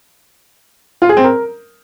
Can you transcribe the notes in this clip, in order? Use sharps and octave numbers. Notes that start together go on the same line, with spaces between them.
F4
G#4
C4
A#4